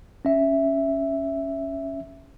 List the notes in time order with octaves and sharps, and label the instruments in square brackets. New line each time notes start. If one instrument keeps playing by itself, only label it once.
[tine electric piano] C#4 E5